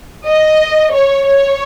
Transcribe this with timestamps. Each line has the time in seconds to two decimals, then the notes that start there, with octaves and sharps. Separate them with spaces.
0.27 D#5
0.93 C#5
1.28 C#5